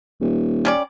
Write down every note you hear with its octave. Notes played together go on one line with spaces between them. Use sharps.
D#1
G3 C#4 D5